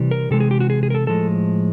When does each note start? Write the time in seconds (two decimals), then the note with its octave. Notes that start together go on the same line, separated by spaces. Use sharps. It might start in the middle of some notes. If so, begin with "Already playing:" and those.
Already playing: C3 E3 G3
0.11 A#4
0.31 C3 E3 G#3 A4
0.40 G#4
0.51 G4
0.60 F#4
0.70 G#4
0.83 G#4
0.90 A#4
0.95 A4
1.07 A2 F3 G#3 A4